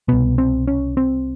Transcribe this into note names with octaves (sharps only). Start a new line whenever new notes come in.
C2 B2 B3
C4
C#4
C4